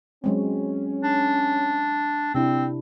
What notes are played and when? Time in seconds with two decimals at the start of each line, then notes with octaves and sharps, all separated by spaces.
0.24 F#3 G#3 C4 C#4
1.03 D4
2.35 C3 C4 D4 E4